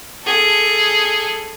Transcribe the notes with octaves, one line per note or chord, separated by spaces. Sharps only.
G#4 A4